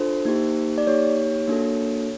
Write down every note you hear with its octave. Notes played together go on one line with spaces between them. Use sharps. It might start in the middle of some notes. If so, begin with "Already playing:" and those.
Already playing: D4 F4 A4 C5
A#3 D#4 G4
D5
A#3 D#4 G4 C#5
A#3 D4 F#4 A4